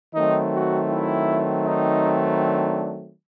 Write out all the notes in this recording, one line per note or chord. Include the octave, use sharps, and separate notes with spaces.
D#3 F#3 A3 C4 D#4
F#4
E4
D#4
D4